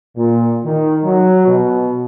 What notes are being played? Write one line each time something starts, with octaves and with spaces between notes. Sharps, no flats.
A#2
D#3
F#3
B2